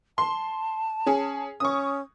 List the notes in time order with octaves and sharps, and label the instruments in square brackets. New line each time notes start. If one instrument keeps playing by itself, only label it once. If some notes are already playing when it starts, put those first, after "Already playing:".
[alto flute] A5 [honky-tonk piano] C6
[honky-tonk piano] C#4 G#4
[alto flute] C#4 [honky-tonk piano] C#6 D#6